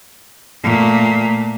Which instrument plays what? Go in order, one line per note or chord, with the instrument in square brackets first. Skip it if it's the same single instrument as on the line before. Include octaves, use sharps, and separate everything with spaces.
[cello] A#2 A3